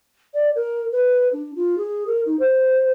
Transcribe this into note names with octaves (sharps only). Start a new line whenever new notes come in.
D5
A#4
B4
D4
F4
G#4
A#4
D#4
C5